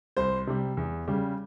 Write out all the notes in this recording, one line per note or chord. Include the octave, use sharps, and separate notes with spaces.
C2 C5
C3 G3
E2
C#3 G3